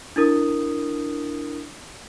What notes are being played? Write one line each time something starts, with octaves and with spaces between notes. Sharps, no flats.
D4 E4 A#4 D#6